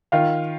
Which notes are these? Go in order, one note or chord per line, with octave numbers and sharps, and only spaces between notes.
D#3 F4 F5